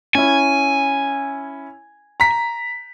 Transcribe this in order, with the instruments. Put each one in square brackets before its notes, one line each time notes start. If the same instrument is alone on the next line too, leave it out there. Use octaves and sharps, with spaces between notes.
[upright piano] C#4 E4 [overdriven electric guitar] G#5
[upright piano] A#5 B6